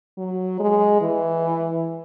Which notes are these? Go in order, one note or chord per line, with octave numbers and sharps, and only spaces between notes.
F#3
G#3
E3